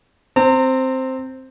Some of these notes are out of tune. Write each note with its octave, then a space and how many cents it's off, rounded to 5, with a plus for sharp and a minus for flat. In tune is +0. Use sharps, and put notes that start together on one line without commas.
C4 +0 A#5 -35